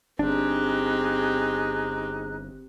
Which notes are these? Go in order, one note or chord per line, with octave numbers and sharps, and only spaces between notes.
G1 C4 D4 D#4 G4 G#4 F#6